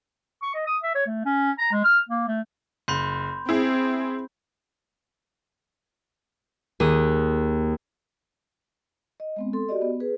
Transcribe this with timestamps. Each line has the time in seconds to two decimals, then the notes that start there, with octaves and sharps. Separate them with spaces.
0.42 C#6
0.54 D#5
0.67 D#6
0.82 E5
0.95 C#5
1.06 A3
1.25 C#4
1.59 A#5
1.72 G#3
1.84 F6
2.09 A#3
2.28 A3
2.88 F#1 B5 C6 G6
3.49 C4 E4 G#4
6.80 D#2 G#4 D#6
9.20 D#5
9.36 G#3 B3 C4
9.53 A4 C6
9.69 F#4 G4 D5 D#5
9.82 B3
10.00 G#4 B4